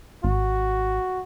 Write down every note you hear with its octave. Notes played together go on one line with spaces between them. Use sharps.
G#1 F#4